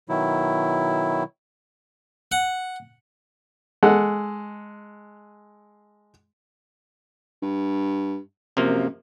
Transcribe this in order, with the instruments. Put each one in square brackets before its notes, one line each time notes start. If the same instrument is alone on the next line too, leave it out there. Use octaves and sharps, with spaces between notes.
[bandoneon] B2 D#3 F#3 E4
[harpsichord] F#5
[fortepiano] G#3 A4 F#5
[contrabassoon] G2
[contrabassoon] F#2 [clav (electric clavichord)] C3 F3 A#3